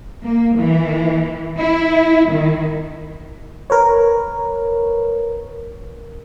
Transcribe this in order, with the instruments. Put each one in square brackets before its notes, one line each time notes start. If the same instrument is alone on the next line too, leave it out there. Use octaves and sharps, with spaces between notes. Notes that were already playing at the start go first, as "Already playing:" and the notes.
[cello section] A#3
E3
E4
D#3
[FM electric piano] A#4 B4 C#5